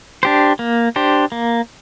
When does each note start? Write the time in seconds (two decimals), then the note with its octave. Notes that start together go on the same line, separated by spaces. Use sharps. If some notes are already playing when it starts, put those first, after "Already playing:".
0.23 D4 G4 C5
0.59 A#3
0.96 D4 G4 C5
1.32 A#3